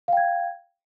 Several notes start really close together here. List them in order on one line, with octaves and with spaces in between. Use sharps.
F5 G5 G#6